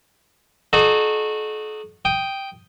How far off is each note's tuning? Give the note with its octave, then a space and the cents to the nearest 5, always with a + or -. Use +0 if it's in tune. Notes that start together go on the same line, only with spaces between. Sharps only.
D#4 -35 F#4 -20 A4 -40
G5 +0 D#6 +0